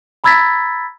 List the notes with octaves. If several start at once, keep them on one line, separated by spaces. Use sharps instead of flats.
A#5 B5 E6 G#6 A6 B6